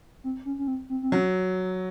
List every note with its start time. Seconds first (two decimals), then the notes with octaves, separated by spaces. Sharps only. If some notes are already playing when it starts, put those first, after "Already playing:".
0.24 C4
0.45 C#4
0.59 C#4
0.68 C4
0.90 C4
1.03 C4
1.11 F#3 C#4